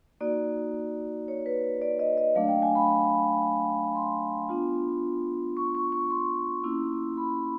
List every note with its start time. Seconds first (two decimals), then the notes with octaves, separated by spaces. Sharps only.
0.21 A#3 D#4 F#4 D5
1.28 C#5
1.46 B4
1.82 D5
1.99 D#5
2.17 D#5
2.35 F#3 A3 D4 F5
2.48 G5
2.62 G#5
2.75 B5
3.95 C6
4.49 B3 D4 F4
5.57 C#6
5.75 C#6
5.92 C#6
6.10 C6
6.64 A#3 C#4 E4
7.17 B5